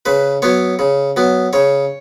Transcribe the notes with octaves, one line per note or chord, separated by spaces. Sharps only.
C#3 B4
F#3 B3 C#5
C#3
F#3 B3
C#3 C#5